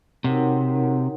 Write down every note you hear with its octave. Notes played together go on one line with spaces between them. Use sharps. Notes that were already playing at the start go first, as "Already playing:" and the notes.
C3 D#4 F#4 A#4 C#5 F#5